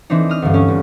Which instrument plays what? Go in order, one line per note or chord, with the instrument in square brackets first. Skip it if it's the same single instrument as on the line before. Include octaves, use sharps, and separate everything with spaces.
[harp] E3 C4 D4 D#4
D#6 F6
D2 G2
C#4
G1